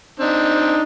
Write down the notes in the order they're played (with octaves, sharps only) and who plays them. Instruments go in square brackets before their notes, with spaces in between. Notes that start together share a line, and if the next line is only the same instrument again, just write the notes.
[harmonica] C4 D4 D#4